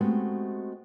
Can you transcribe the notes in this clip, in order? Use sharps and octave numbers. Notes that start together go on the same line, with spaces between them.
G#3 A3 B3 C4 F#4 G4